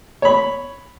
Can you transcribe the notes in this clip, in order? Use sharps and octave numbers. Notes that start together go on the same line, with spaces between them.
C#5 B5